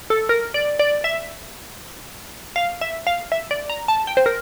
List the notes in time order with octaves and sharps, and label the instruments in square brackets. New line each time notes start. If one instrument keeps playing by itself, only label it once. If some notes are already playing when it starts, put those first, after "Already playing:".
[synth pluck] A4
A#4
D5
D5
E5
F5
E5
F5
E5
D5
A#5
A5
G5
C5
A#4